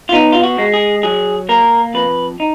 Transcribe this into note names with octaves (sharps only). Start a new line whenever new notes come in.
F4
B3 D#4
F4
F#4
G#3
G#4
F#3 G#4
A#3 A#4
F2 B4
D#4